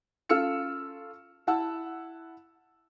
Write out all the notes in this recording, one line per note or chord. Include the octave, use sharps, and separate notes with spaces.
C#4 F4 A4 E6 F6 C#7
E4 F#5 A5 E6